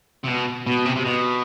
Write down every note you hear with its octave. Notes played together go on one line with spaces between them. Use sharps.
C3
B2
B2
C3
C3
B2